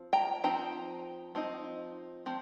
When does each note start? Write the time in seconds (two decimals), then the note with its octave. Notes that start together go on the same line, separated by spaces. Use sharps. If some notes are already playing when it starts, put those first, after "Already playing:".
Already playing: F3 C4
0.13 G5 A#5
0.44 F3 C4 D#4 G5 A#5
1.35 F3 C4 D#4
2.26 F3 C4